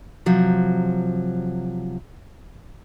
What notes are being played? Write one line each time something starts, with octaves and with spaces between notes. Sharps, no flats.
C3 F3 F#3